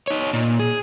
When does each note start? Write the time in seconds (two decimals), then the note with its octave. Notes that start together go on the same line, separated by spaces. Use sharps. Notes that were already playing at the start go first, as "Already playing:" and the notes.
0.08 D#4 C#5
0.33 A#2
0.59 G#4